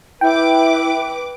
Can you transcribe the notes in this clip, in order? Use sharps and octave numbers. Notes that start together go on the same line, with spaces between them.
E4 B4 G5 D6